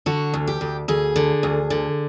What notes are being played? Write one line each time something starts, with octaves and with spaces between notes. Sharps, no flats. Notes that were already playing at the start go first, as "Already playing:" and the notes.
D3 F#4
D2
G4
D2
D2 G#4
D3
D2
D3